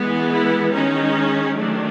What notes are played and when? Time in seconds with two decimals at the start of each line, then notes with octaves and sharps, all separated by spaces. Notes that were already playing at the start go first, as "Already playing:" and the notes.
Already playing: E3 G#3 B3
0.32 E4
0.73 D#3 G#3 C#4 D#4
1.56 D#3 F#3 A3 D4